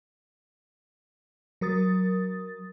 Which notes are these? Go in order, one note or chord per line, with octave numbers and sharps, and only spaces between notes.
F#3 A#4 D#6 A6